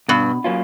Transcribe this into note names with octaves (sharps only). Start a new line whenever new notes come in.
G2 B2
F#3 A#3 C#4 F4